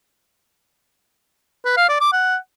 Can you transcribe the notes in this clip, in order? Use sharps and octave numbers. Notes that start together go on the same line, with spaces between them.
B4
F5
D5
D6
F#5